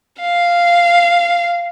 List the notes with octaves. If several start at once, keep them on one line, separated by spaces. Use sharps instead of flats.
F5